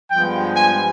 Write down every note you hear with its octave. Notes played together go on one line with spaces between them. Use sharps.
G2 F3 G#3 B3 G5
G#5